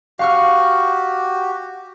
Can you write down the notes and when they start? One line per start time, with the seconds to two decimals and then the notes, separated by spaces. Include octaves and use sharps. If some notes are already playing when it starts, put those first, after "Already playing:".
0.19 F#4 G4 F5 C#6 F6